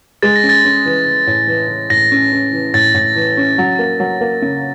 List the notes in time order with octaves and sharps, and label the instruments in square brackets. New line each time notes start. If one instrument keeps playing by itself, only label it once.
[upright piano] G#3 [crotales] A6
[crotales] A#6
[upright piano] C#4
[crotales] A6
[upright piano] C#4
E3
E3
A2
E3
E3
[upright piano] A2 [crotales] A#6
[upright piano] C#4
C#4
E3
[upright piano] A2 [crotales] A6
[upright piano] A2
E3
C#4
F#3
A#3
F#3
A#3
C#3